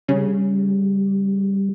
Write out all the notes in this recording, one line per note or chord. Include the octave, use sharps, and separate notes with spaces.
C#3 G3